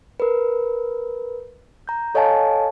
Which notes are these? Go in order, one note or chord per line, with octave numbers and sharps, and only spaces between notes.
A#4 B4
A#5 G6
A4 C#5 D#5 F5 G#5 A5